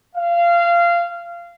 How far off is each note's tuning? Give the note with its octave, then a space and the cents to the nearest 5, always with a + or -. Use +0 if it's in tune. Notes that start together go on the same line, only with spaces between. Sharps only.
F5 -20